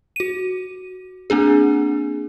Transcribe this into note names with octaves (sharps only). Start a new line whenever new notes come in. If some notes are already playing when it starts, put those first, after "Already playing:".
F#4 D#7
A#3 C4 D4 G#4